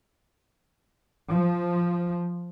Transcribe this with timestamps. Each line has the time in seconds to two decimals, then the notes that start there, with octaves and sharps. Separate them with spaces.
1.29 F3